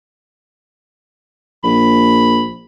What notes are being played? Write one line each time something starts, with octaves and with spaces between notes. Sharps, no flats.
A#1 B5